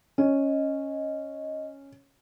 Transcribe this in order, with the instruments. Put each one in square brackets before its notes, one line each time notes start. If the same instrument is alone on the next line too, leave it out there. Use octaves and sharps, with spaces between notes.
[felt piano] C#4 [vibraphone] D#5